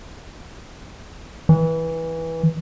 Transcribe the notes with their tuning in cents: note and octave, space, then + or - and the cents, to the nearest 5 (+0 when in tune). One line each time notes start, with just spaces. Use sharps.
E3 -15